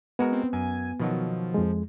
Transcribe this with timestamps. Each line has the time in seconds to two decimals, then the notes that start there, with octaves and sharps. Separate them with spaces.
0.19 G#3 B3 F#4 A#4
0.32 C4
0.53 F#2 G#5
1.00 B2 D#3 F3 F#3
1.54 F2 G#3